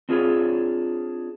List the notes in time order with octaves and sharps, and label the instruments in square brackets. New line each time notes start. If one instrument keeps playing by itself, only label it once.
[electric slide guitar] C4 D4 F4 G#4 B4 C#5